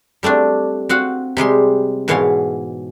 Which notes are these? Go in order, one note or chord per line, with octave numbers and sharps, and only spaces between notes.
G3 A3 C4 D4
C4 F#4 F5 F#5
C3 G3 G#3 C6
G#2 B2 E3 C#5 F5 C6